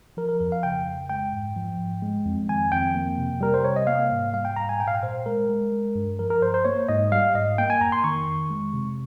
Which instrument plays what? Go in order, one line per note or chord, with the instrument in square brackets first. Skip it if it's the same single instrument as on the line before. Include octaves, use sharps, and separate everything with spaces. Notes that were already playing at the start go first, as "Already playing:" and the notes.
[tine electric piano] F3 A#4
A#4
F2 A#4
F5
C#3 G5
F2
G#3 G5
G#2
F3
G#2
G#3
F2
D#3 G#5
F2 G5
A#3
C3
G3 A#4
C5
C3 C#5
D#5
A#3 F5
G#2
G3 F5
G5
G#2 A#5
G#5
A#2 G5
F5
G5
A#2 C5
G#3 A#4
G#3
G#3
G2
F3 A#4
A#4
G2 C5
C5
A#3 C#5
G#2 D#5
G3 F5
G#2 D#5
A#3 G5
G#5
F2 A#5
C6
D#3 C#6
F2
G#3
C3